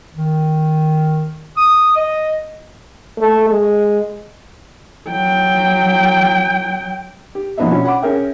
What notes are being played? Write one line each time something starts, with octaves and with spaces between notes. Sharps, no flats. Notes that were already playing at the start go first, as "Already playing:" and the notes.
D#3
D#6
D#5
A3
G#3
F#3 G5
G4
A#1 A#2 B3 D4 D#4 E5
B2 F3 C#4
C#5 F#5 B5 D6
C#4 G#4 A#4 E5 G5